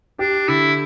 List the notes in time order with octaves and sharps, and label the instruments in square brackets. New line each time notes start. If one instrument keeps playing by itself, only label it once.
[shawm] D4 [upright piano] G4
[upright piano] D3 [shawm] E4